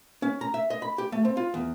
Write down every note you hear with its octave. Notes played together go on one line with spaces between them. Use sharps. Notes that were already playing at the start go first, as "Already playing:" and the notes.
C#4
A#5
E5
D#5
B5
G4
A3
C4
F4
E2